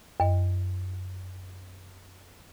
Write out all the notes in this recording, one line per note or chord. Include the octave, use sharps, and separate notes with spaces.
F#2 D#5